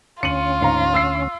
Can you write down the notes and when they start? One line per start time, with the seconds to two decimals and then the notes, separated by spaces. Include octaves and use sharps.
0.23 D2 C#4 F4 C#7 D#7 F#7
0.61 G#2 F5 A#5
0.94 E6 C7